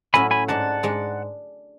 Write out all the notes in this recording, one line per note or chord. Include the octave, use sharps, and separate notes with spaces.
A2 F#3 C#4 E4 G#5 B5
G#5 B5
G#2 G#3 D4 F#5 A5
G#2 G#3 D4